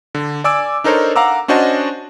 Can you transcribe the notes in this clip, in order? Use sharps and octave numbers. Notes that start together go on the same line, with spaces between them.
D3
D5 G#5 D6 E6 D7
D4 D#4 A4 A#4 C5 C#5
F5 F#5 A#5 D6 E6
C#4 D4 F#4 C5 D#5 A5